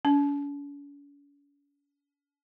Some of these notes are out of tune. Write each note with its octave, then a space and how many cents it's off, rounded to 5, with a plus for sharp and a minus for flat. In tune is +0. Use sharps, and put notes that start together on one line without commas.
C#4 +45